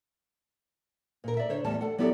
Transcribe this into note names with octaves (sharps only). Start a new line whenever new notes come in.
A#2 A#4
D5 E5
D3 C5 C#5
E2 A2 G3 A5
A4 F#5
F#3 B3 E4 G4 A4 D5